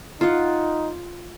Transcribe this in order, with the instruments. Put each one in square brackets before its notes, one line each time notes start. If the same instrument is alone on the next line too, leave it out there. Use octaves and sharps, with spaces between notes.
[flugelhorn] D#4 [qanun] F4 F#5